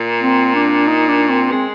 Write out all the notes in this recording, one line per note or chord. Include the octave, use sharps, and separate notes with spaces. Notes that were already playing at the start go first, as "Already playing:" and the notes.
Already playing: A#2
C4
D4
D#4
D4
C4
G#3 C4